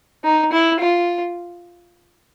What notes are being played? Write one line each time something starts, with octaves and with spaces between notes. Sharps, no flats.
D#4
E4
F4